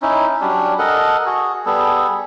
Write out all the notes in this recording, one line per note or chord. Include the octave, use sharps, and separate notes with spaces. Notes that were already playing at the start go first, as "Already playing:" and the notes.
C#4 D#4 E4
F#3 G3 C#4 D4
A4 A#4 D#5 F#5
F#4 G#4
G3 B3 G#4 A4